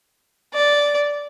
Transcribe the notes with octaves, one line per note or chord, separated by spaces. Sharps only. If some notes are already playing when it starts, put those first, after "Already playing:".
D5